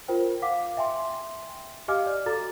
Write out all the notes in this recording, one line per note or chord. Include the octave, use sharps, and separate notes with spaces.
F4 A#4 C5 G5
F5 F#5 D6 B6
E5 G5 G#5 C6
G4 D#5 F5 G#5 D6 F6
D5
F#4 A4 A#5 A6